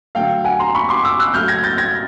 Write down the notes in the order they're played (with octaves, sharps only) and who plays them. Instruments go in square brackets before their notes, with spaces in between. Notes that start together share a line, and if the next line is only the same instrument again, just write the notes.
[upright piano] D3 F#3 A3 F5 G5
F#5 G#5
A#5 C6
B5 C#6
C6 D6
D6 E6
E6 F#6
C#3 F#3 A3 F6 G6
G#6 A#6
G6 A6
G#6 A#6